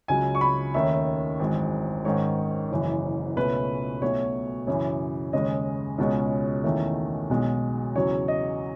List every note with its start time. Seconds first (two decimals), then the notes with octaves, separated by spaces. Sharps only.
0.08 C#2 C#3 F#3 G#5
0.35 C#6
0.41 B5
0.74 D#2 D#3 A3 C#4 E5
1.39 G#1 F#2 E3 G#3
2.05 G#2 D#3 G#3 C#4 C#5
2.71 F#1 F#2 E3
3.36 C#2 B2 A3 C#4 B4
4.01 B1 B2 A3 C#5
4.67 F#2 C#3 E3
5.33 D#2 C#3 G#3 D#5
5.98 C#2 B2 G#3 C#4
6.64 E2 D#3 A3 C#4
7.30 B1 B2 G#3
7.95 E2 C#3 F#3 C#5
8.28 D#5